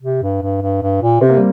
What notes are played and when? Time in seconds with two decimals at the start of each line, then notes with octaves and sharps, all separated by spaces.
0.02 C3
0.22 G2
0.42 G2
0.62 G2
0.82 G2
1.02 A#2
1.21 C3 C4
1.29 A#3
1.37 G3